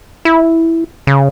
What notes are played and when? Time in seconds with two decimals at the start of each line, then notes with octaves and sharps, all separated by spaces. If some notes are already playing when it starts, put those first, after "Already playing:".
0.25 E4
1.07 C#3